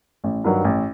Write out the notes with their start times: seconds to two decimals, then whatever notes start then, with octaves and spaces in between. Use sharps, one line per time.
0.24 A1
0.44 G2 D#3 F#3
0.64 A1